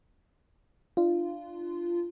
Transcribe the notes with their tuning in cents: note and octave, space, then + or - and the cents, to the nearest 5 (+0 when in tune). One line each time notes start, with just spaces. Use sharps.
D4 +25 F4 -15